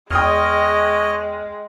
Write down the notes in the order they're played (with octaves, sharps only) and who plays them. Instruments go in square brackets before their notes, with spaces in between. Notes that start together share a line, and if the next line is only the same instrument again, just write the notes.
[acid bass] E2 [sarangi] G#3 [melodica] C#5 D#5 [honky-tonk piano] G5 D#6 F6